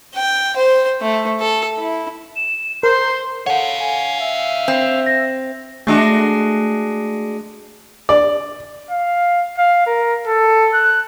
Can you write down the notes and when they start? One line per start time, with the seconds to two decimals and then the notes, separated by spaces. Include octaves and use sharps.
0.14 G5
0.56 C5
1.01 A3
1.40 A4
1.78 E4
2.36 E7
2.83 A#4 C5 C6 G6
3.46 A4 C#5 F5 F#5
3.80 G#5
4.20 E5
4.68 C4
5.06 A#6
5.87 G#3 A3 D4 F#4
8.09 D5
8.91 F5
9.57 F5
9.87 A#4
10.27 A4
10.74 F#6